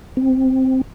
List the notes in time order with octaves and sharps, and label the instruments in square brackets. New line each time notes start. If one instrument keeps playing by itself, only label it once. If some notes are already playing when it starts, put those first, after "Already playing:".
[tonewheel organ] C4